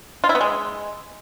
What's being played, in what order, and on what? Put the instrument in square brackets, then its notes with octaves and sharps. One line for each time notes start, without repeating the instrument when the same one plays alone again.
[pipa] F4
E4
B3
G#3